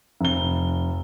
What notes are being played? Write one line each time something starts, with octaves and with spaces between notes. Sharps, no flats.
F1 G7